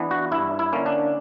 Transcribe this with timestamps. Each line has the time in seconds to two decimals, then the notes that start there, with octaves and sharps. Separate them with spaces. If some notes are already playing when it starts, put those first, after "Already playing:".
Already playing: E3 B3 D4
0.11 F#4
0.31 G2 E4
0.59 E4
0.73 D3 A#3 C#4
0.86 D4